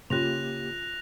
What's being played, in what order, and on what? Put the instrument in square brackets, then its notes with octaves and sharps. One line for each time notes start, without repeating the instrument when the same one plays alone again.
[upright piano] C#3 [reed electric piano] A#3 G4 [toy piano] F4 C6 [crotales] F#6 A#6 F7